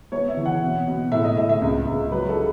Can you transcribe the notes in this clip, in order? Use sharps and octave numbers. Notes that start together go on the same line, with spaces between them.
B3 C#5
E5
E3
F#5
B2
B2
A2 E5
D#5
A2 E5
E5
C#2
C#2
F#3 B4
A4
C#3